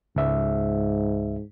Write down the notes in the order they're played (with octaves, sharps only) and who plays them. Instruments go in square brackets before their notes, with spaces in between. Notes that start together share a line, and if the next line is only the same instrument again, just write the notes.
[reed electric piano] C#2 E5 [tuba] G#2